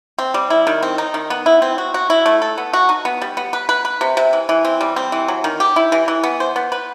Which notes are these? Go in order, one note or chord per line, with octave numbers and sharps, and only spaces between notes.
C4
G3
E4
D#3
C4
D#4
D#3
B3
E4
C4
F#4
F#4
E4
A3
A4
B3
F#4
D#4
B3
G3
B3
B4
B4
B4
C3
C3
E3
E3
C4
G3
C4
E3
F#3
D#3
G4
E4
E3
E3
B3
C5
B3
B4